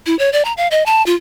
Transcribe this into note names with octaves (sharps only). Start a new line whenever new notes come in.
E4
C#5
D5
A#5
F5
D#5
A5
F4